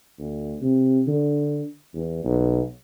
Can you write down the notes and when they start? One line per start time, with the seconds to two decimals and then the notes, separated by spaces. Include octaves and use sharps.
0.19 D2
0.61 C3
1.07 D3
1.95 E2
2.24 B1